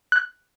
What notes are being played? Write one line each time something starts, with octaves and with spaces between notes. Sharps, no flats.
F#6